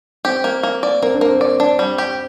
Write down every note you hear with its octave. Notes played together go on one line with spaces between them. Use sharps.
C4 G4
A#3
A#3
D5
A#3 C4
D4
A#3
C4
D5
D4
G3
G4